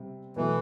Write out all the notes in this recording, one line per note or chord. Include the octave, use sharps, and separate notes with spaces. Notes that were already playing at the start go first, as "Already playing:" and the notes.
Already playing: C3 G3 C4
B2 E3 F#3 A3